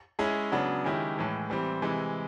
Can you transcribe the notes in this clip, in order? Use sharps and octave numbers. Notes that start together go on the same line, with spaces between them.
G#3 C#4 E4 G#4
C#3 F#3 B3 D4
D#3 G#3 C#4 E4 G4
A2 E3 G#3
E3 G3 C4
C3 E3 G#3